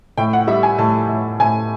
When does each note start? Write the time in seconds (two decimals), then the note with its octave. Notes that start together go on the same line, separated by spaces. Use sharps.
0.18 A2 G5
0.33 F#5
0.47 G3 E5
0.63 G#5
0.78 A2 A5
1.08 A2
1.40 A2 G#5